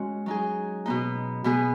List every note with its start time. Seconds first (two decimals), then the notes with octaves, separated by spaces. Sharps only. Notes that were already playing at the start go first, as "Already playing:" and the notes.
Already playing: G#3 C#4 F#4
0.26 F#3 D#4 G#4
0.86 B2 B3 D#4
1.44 B2 B3 G#4